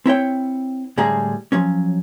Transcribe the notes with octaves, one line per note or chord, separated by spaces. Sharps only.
C4 E4 C#5 G5
A2 D3 G3 G#3 G#4 A#5
F3 F#3 C#4